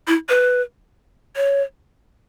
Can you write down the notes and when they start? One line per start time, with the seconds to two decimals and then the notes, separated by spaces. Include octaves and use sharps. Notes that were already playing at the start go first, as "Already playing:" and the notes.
0.07 E4
0.29 B4
1.36 C#5